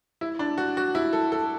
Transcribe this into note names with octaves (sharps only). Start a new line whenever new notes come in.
E4
D4
F#4
F#4
E4
A4
A4